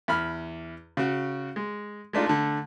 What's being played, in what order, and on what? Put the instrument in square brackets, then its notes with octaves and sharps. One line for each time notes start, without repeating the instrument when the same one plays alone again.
[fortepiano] E2 B5 F6
C#3 F#4
G#3
G#3 A3 D4 D#4 F4
D3 A3